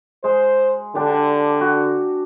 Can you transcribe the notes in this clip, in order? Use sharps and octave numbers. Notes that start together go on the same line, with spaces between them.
G#3 C5
D3 D4 G4
F#4